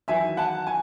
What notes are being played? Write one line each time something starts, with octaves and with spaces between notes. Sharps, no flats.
E2 D#3 F#3 E5 G#5
F#5 A5
G#5